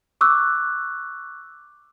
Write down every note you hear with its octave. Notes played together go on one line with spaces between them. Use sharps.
C#6 D6 E6 F#6